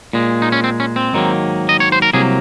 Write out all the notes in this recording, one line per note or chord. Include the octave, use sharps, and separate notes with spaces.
A#2 G#3
D#4
C#4
C4
C#4
C4
G#2 D#3 F#3 A#3
D#5
C#5
C5
A#4
C2 C3 F#3 A#3 G#4